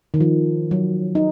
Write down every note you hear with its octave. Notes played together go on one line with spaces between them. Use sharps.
D#3
F3
F#3
D#4